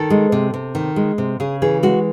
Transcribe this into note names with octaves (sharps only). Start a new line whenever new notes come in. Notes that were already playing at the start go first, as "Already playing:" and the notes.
Already playing: D#3 A4
G#3
C3
C3
D#3
G#3
C3
C#3 G#4
E3 G#4
G#3 F#4